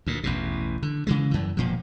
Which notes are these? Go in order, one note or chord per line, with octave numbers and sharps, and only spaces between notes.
D2 A#2
A1 E2 B2
D3
C#3 E3 G#3
F#2 E3
E1 A#2 F3